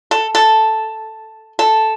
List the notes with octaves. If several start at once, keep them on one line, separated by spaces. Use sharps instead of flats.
A4
A4
A4